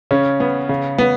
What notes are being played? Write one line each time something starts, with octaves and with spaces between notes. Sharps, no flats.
C#3 C#4
B3
C#3
B3